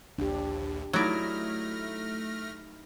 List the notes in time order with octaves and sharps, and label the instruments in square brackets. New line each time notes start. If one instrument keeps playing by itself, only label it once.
[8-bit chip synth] A#1 D#2 [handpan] D4 G4
[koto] F#3 D5 [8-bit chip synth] A3 F6 A#6 [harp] D#4 E4